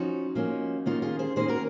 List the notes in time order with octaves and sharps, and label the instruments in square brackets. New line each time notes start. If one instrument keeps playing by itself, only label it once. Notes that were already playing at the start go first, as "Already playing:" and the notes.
Already playing: [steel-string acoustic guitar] F3 C#4 D#4 F#4
F3 A#3 C#4
D#3 A#3 C#4 F4
F4 G#4
G#4 C5
D#3 A#3 C#4 G#4 C5
F#4 A#4